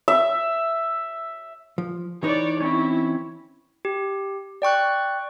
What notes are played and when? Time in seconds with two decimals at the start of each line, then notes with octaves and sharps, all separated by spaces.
0.08 E5
1.78 F3
2.23 E3 D#4 B4 C#5 D5
2.61 C4 C#4 E4 C#5
3.85 G4
4.62 D5 G5 C#6 F#6